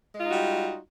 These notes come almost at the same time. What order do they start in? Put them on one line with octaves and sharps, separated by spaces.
G#3 F4 D#4 F#4 G3